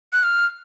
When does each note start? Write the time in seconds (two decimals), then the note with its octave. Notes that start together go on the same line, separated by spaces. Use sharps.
0.13 F#6
0.23 F6